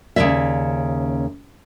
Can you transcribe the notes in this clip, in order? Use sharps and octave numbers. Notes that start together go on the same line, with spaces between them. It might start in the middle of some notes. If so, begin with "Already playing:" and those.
D#2 C#3 F3 A#3 D5 E5